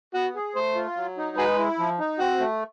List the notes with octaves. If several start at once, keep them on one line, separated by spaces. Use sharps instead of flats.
B3 F#4
G#4
A3 C5
F4
F#3
D#4
G#3 F#4 G#4 B4
E4
F3
D#4
C4 F#4
A3